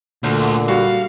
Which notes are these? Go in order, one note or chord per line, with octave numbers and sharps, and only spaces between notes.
D2 A#2 D3
G3 F#4 F5